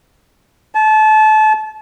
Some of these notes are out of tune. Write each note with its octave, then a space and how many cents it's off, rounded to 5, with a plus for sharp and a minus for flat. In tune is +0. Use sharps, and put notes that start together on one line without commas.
A5 -30